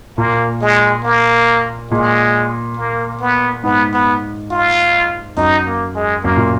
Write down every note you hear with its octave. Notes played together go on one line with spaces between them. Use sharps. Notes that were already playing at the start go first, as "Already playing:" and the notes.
A#2 A#3
G#3
A#3
A#2 G#3
A#3
B3
G#2 B3
B3
F4
F#2 D#4
A#3
G#3
F#2 A#3
A#2